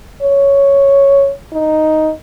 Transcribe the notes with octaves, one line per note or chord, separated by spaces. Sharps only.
C#5
D#4